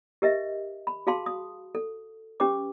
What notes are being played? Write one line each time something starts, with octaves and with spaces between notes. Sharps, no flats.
G4 A#4 D#5 E5
B5
F#4 G#4 F5 A5 C6
D#6
A4
C#4 G4 B4 D6